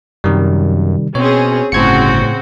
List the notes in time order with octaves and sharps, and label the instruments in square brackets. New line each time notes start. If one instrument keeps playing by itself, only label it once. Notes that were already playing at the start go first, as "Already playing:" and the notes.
[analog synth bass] F#2 [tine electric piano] C3 D#3 G3
[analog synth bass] B2 [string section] C4 C#4 G#4 [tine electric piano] C#5
[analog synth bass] G1 [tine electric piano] A2 G#6 C#7 [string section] C#3 C4 F#4